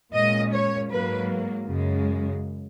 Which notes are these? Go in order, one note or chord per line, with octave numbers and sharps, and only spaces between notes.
A#2 G#3 C#4 D#5
C#5
G#2 F#3 A#3 B4
F#2 C#3 G#3